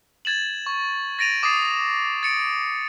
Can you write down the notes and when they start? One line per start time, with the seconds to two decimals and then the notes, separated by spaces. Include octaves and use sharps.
0.25 G#6 A6 E7 F#7
0.66 C#6
1.19 A6 A#6 D7 D#7 F7
1.43 D6 D#6 A6 C7
2.23 A6 C#7 D7